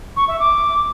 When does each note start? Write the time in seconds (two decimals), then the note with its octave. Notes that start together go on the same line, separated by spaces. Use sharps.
0.16 C#6
0.28 E5
0.39 D6